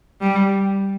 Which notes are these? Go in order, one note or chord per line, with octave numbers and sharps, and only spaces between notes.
G3